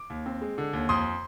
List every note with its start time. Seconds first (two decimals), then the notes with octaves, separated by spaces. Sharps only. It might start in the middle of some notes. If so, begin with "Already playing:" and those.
Already playing: D6
0.10 D#2
0.26 C4
0.41 G#3
0.58 D3
0.73 D#2
0.89 F2 C6 D#6